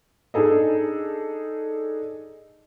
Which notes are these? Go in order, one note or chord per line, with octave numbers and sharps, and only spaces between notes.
D4 D#4 G#4 A4 D#5